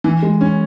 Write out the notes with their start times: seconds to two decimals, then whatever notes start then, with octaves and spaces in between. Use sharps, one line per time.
0.04 E3
0.22 G#3
0.41 C#4